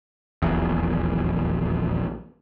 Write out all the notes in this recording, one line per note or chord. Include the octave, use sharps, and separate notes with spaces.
D#1 A#1 E2